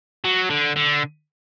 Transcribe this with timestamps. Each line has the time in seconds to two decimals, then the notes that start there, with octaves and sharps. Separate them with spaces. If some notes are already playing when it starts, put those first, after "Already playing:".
0.25 F#3
0.50 D3
0.76 D3